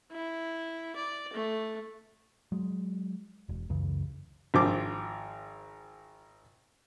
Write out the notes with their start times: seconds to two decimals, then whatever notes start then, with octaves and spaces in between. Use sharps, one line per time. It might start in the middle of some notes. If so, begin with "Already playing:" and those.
0.12 E4
0.96 D5
1.33 A3
2.52 F#3 G#3
3.49 E1
3.69 C#2 F#2 C#3 E3
4.54 G#1 F3 C5 D6